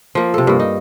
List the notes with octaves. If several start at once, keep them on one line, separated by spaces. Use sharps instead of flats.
F3 A#3
C3 A4
G2 A#3
D#4